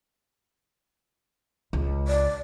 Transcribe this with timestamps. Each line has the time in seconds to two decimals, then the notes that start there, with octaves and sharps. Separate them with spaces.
1.73 C#2
2.08 D5